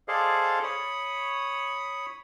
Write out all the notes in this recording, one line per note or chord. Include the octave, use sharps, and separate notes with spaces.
G#4 A4 C5 D5 D#5 F5
C#5 B5 D#6